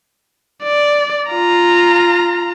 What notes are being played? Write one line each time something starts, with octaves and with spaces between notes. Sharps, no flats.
D5
F4 A#5